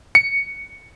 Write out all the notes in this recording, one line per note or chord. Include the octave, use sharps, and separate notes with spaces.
C#7